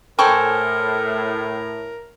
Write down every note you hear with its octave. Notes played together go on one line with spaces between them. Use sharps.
A2 A4 A#4 C5 G5 G#5 B5 C#6